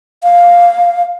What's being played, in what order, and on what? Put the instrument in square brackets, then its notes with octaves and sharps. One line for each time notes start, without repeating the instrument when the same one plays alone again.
[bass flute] F5